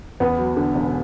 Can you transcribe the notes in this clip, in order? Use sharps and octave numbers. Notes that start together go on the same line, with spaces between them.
E2 B3
F#3
D3
E1